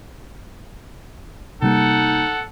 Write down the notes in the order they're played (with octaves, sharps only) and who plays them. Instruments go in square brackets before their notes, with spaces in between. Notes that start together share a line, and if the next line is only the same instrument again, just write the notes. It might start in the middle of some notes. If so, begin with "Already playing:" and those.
[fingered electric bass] C3 G3 A#3 [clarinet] D#4 [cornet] A4 [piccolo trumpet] F#5